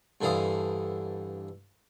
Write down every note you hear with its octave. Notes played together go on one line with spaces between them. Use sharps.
G2 D3 E3 C5 F5 D#6